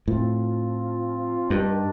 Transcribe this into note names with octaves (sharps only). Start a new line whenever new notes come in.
A2 F3 C4 F4
G2 D#3 G3 D4 G4 A#4